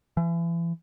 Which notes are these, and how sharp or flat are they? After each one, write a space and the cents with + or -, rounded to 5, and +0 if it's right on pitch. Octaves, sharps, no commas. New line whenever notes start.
E3 +35